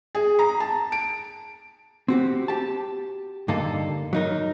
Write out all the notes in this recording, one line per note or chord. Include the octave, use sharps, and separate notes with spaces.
G#4
A#5
A5
D7
C4 F#4 G4
G4 A5
G2 D3 A#3 D#4 A4
F#3 D#4 A#4